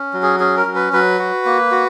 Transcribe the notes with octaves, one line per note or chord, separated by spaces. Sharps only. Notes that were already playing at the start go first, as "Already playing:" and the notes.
Already playing: C#4
F#3
G#4
C#4 G#4
A#4
F#3
B4
F#3 B4
F#4
A#3
F#4